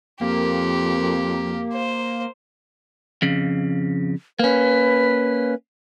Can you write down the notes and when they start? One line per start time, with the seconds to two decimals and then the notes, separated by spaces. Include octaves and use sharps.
0.21 F2 A#3 G4
1.72 C5
3.22 F2 C#3
4.39 A#3 C#4 B4